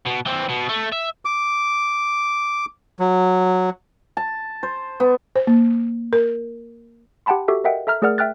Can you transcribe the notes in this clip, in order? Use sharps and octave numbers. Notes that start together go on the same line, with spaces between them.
B2
E3 C4
B2
A3
E5
D6
F#3
A5
C5
B3
C5
A#3
A#4
G4 F#5 G5 A5 B5 C6
F#4 G4 A4 E5
A#4 D#5 E5 F#5 G5
A4 E5 A#5 F6
A3 G#4 A#4 D5 F#5 F6
E5 G5 F6 F#6 A6